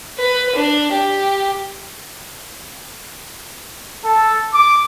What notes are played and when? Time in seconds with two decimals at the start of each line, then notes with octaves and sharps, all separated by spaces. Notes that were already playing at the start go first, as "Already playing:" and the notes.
0.19 B4
0.56 D4
0.93 G4
4.05 A4
4.53 D6